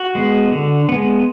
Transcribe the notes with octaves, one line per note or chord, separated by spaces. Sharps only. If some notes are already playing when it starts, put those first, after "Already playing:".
Already playing: F#4
G#3 B3
D3
G#3 B3